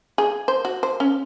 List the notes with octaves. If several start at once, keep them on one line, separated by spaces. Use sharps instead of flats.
G#4
C5
F#4
C5
C#4